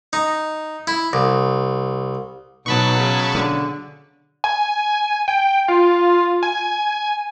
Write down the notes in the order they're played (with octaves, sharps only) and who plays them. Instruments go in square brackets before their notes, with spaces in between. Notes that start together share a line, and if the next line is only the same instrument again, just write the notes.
[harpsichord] D#4
E4
C2
[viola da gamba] B2 F#3 [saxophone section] D#4 B4 [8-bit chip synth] A5 B5 C#6
[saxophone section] C#3
[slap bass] D3
[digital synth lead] G#5
G5
F4
G#5